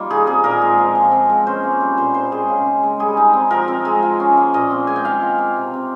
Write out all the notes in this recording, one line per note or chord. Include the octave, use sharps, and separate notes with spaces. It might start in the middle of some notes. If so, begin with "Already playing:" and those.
Already playing: D#3 G3 A#3 F4
D#4 G#4
C4 G#4
A#2 A#4
G#3
F3
F3
C4
G#3
C#4 C5
A#3
G3
A#2 C5
D#4 C5
G#3 G#4
C#3
D#4
G#3
G3 G#4
D#4
C4
F3 A#4
C4
G#3
F4
C#4
A#3
A#2 D#5
C4
G#3 G#5
G5
D#3 F5
F4
A#3
C3
C4